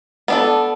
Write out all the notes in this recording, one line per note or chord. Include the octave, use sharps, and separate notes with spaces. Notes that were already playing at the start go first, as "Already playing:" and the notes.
B3 D4 A4